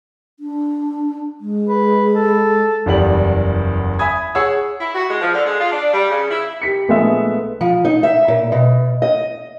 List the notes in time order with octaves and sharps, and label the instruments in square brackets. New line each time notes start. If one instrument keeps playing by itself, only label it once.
[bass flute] D4
G#3
[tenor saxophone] B4
A4
[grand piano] F#1 E2 G3 F#7
E5 G#5 B5 D#6 G#6
G#4 C#5 F#5 E6
[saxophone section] E4
F#4
G#3
F3
D3
G#3
F4
D4
G3
C#3
E4
[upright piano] G4 B6 C#7
A#1 G#3 A3 B3 B4 E5
[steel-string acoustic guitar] F3
D#4
E5
A#2
B2
D#5